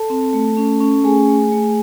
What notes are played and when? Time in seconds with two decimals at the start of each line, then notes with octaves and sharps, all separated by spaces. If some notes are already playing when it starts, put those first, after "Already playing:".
Already playing: A4 A5
0.10 C4
0.33 A3
0.57 C#4
0.80 C#4
1.04 A3 G#4 G#5
1.28 A3
1.52 A3